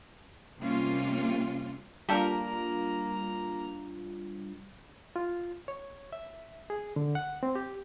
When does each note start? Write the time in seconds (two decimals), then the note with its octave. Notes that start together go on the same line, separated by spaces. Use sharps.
0.61 C3 G3 A#3 C#4 F4
2.09 G3 A#3 D4 F4 G4 A4 A#4 A#5
5.16 F4
5.68 C#5
6.13 E5
6.70 G#4
6.96 D3
7.15 F#5
7.43 C4
7.55 G4